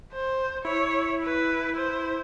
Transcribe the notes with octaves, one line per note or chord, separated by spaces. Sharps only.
C5
E4 C#5
B4
C5